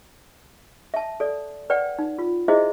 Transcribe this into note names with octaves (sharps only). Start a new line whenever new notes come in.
E5 A5
A4 D5
B4 D5 F#5 G5
D#4
F4
E4 F#4 G#4 C5 D#5 E5